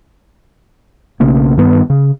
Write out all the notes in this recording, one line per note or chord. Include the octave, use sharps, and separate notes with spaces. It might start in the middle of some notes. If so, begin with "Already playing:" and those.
B1 C#3 A3 A#3
G2 D#3 B3
C#3